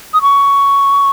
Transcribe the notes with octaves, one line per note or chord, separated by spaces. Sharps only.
D#6
C#6